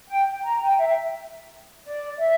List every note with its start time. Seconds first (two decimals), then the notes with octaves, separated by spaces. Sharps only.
0.09 G5
0.44 A#5
0.62 G5
0.79 E5
1.84 D5
2.19 E5